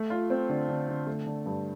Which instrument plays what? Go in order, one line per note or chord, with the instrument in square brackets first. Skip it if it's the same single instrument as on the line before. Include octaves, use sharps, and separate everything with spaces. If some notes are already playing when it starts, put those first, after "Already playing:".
Already playing: [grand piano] A3
F4
C4
D3
D3
D3
A3
D3
G2